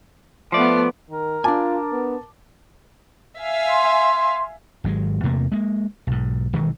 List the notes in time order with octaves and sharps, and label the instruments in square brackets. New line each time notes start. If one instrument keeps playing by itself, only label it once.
[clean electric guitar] F3 D5 [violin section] A3 B3
[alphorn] D#3 [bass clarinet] A#4
[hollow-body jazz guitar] D4 G#5 [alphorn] F4 [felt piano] A5 D6
[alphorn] B3
[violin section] E5 F5 G#5
[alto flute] C6
[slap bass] G#1 F#3 G#3
E2 C3 A3 A#3
G#3 A#3
B1 G#2
B1 D#3 E3 G#3